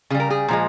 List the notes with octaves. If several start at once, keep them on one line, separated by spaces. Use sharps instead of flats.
C#3 G3 G#4
A#4
G#4
A#2 F3 G#3